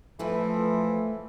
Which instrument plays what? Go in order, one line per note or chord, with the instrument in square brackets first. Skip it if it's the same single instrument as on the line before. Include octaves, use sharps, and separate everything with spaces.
[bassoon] E3 [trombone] F3 [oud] A3 E4 B4